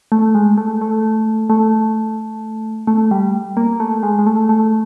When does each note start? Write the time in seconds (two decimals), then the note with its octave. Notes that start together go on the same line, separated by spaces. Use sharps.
0.12 A3
0.35 G#3
0.57 A3
0.81 A3
1.50 A3
2.87 A3
3.11 G3
3.57 A#3
3.80 A3
4.03 G#3
4.19 G#3
4.26 A3
4.49 A3